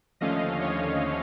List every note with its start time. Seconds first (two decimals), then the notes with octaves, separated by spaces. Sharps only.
0.21 D#2 D3 F3 A3 C#4 D#5 F5
0.60 C#5 D#5